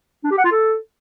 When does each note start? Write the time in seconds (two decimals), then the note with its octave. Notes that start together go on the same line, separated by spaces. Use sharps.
0.24 D4
0.31 G4
0.38 F#5
0.44 F4
0.51 A4